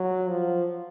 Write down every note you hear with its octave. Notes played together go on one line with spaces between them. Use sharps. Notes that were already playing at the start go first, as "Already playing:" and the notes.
Already playing: F#3
F3